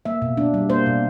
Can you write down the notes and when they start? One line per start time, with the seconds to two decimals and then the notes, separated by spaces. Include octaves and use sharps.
0.05 A#3 E5
0.22 B2
0.37 D4
0.54 G3
0.70 A#3 C5
0.86 B2